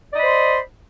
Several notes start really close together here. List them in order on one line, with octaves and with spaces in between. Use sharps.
D5 D#5 B5 C5 C6